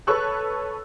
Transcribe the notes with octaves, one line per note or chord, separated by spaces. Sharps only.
A4 B4 C#5 C#6 E6 F#6